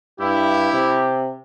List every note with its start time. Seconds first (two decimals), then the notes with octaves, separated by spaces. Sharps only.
0.20 G2 E4 G4
0.73 C3